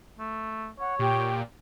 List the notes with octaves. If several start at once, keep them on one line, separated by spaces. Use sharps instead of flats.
A3
C#5 F#5
A#2 G4 G5